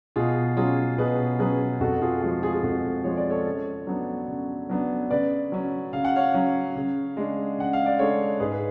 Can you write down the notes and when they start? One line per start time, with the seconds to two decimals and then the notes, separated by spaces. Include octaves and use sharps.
0.16 B2 F4 G#4
0.57 F#3 C#4 F4 G#4
0.98 B2 G#4 B4
1.39 F#3 C#4 G#4 B4
1.81 F2 F#4 A4
2.01 F4 G#4
2.22 F3 G#3 F#4
2.43 F4 G#4
2.53 G#4
2.63 F2 F#4 A4
3.04 F3 G#3 C#5
3.17 D5
3.30 A4 C#5
3.45 C#3
3.87 F#3 B3 D4
4.28 C#3
4.69 F#3 B3 D4
5.10 C#3 B4 D5
5.52 F#3 C#4
5.93 C#3 F5
6.05 F#5
6.16 C#5 F5
6.34 F#3 C#4
6.76 C#3
7.17 G#3 D4
7.58 C#3 F#5
7.73 F5
7.86 D5
7.99 G#3 D4 A4 C#5
8.40 G#2 G#4 B4
8.52 B4